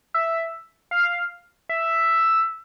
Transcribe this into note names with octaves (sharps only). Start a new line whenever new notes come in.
E5
F5
E5